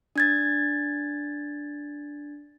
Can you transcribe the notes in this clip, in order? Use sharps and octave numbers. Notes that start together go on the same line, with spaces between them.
D4 G#6 A6